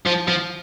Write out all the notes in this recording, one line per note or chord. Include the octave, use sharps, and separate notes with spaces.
F3
F3